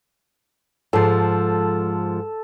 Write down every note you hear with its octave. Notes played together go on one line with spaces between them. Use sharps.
G#2 F3 A4